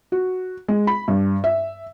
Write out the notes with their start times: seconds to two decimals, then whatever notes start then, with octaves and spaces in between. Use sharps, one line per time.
0.12 F#4
0.68 G#3
0.87 B5
1.08 G2
1.44 E5